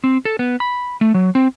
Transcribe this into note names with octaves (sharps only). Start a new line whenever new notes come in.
C4
A4
B3
B5
A3
F#3
C4